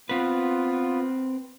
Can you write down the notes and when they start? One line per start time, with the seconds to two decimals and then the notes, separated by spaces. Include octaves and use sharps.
0.09 B3 C4 F4 B4